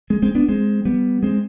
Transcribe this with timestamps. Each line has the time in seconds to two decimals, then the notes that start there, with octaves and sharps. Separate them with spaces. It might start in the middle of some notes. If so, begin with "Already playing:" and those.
0.10 G#3 C4
0.22 G#3 C4
0.35 B3 D4
0.49 G#3 C4
0.85 G3 B3
1.23 G#3 C4